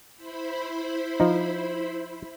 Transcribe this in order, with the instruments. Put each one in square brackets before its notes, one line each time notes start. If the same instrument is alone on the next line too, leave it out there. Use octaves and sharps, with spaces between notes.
[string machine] E4 C5 B5
[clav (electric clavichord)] F3 D#4